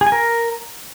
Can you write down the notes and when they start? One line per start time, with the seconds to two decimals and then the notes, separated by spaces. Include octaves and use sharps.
0.01 G#4
0.07 G#5
0.12 A#4